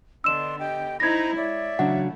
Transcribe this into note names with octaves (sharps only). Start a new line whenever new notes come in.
D3 B3 D4 D#5 C6 E6 E7
G4 D#5 G5
D#4 E4 C5 A#5 B5 G#6 A#6
G#3 C#5 D5 E5
C#3 E3 F#3 A3 D4 E4 F#5